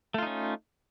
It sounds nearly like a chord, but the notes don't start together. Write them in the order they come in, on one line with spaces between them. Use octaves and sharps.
A3 F4 D#4 C#4